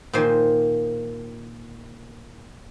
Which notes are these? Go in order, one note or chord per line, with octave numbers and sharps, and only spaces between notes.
A#2 D#3 F3 C5 G#5 C6